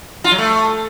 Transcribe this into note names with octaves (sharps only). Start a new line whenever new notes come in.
F4
F#3
A3